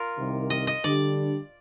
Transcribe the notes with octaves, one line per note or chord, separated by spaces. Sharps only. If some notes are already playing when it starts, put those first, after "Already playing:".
Already playing: F4 A#4
C2 C3 D#3
D#5
D#5
D3 G3 D4 G4 D5